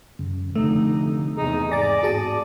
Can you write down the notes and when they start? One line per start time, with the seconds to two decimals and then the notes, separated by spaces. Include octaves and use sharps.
0.19 F#2 C#3
0.55 F1 D3 A3 D#4
1.37 E2 C3 D#4 G#4
1.72 G#2 D5 G#5 A6 A#6
2.03 G#1 A2 F#4 G#4 A5 D#6